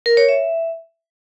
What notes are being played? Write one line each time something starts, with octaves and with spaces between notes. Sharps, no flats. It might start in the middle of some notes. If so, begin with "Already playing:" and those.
A#4
C#5
E5